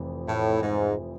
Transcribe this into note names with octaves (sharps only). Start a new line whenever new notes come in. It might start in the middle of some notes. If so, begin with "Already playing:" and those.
Already playing: F1 F2 E3
A2
G#2